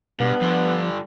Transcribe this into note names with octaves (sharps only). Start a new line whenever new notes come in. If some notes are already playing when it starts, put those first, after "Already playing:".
G2 B2 B3
G2 D3 F3